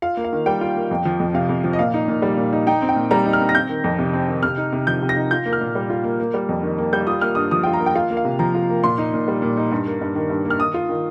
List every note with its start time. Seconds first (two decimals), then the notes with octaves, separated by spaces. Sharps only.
0.02 F4 F5
0.17 A#3
0.24 F5
0.32 D#3
0.46 G3 G5
0.61 F4
0.76 A#3
0.91 F2
1.05 F3
1.20 F2
1.34 C3 F5
1.49 F2
1.64 F3
1.73 D#5
1.79 A#2 F5
1.94 D#4
2.08 A#2
2.22 G3
2.37 A#2
2.53 D#4
2.67 D#4 G5
2.82 C4
2.89 G5
2.96 A#2
3.11 G3 A#5
3.26 D#4
3.33 F6
3.40 C4
3.49 A#6
3.55 C4 G6
3.69 D#3
3.84 F2
3.99 C3
4.13 C4
4.28 D#3
4.43 C3 F6
4.58 D#4
4.72 C3
4.87 F3 G6
5.02 C3
5.09 A#6
5.16 D#4
5.31 F4 G6
5.46 A#3
5.53 F6
5.61 A#2
5.75 G3
5.90 F4
6.04 A#3
6.20 A#3
6.34 G3
6.49 F2
6.63 D#3
6.78 A#3
6.93 G3 G6
7.07 F4 D#6
7.22 A#3 F6
7.35 G2 D#6
7.51 F3 D#6
7.63 F4 G5
7.73 A#5
7.81 A#3
7.86 G5
7.95 F4 F5
8.10 A#3
8.17 F5
8.25 C3
8.39 F3 A#5
8.55 F4
8.69 A#3
8.84 A#2 C6
8.98 D#4
9.14 A#2
9.28 G3
9.42 A#2
9.57 D#4
9.72 G2
9.86 A#3
10.01 G2
10.15 D#3
10.30 G2
10.45 A#3
10.50 F6
10.59 D#3 D#6
10.74 F4
10.89 D#3